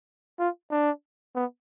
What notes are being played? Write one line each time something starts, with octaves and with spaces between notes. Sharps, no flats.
F4
D4
B3